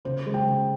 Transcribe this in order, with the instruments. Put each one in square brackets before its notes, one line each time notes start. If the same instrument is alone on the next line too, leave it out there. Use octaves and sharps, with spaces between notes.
[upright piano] C#3 [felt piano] C5
[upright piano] G#3
[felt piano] G5
[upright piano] C#3